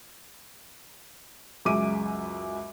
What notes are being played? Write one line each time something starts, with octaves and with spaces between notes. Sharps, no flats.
C#2 F#2 G#3 E5 D6 D#7